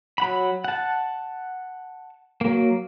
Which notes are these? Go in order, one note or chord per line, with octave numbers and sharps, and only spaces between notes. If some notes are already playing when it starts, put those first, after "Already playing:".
F#3 F#5 B5
F#5 A5
F#3 A#3